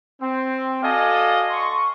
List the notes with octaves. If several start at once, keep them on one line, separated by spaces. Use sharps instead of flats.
C4
F#4 A4 D5 D#5 F5 G#5
C6 C#6